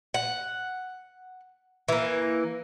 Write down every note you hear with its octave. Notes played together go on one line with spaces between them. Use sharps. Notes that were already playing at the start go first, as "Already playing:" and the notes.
F#5
E3 A#3